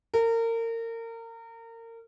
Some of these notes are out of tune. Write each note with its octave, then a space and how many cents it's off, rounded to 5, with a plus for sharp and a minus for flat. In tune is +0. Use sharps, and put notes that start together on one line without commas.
A#4 -30